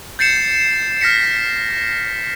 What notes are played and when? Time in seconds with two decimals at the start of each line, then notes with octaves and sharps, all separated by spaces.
0.19 G6 A6 C7 C#7 E7
1.01 F6 A#6 B6 C#7